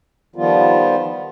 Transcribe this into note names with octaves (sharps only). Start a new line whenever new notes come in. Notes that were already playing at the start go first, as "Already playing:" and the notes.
D#3 F3 G3 B3 F4